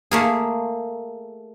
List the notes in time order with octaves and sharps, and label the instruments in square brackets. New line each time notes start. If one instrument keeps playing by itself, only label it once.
[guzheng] A3 A#3 G#4